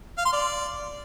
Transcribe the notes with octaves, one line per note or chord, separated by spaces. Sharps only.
F5
C6
D5